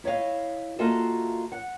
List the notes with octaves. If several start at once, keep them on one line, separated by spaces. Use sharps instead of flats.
E4 C#5 D#5 F5
A#3 F4 F#4 A4 D#5 E5
F#5